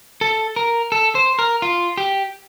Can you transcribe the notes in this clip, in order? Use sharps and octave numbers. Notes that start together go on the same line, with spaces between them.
A4
A#4
A4
C5
A#4
F4
G4